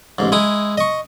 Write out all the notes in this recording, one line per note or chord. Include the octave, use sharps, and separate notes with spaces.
A1 G#2
G#3 E4 D#6
D#5 C#6